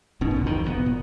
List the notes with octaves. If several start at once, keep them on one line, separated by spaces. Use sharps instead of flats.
G1 B2 D#3 C#4
C2 D3
E1 A#1 F2 D#3
F1 G#2 B3
A#2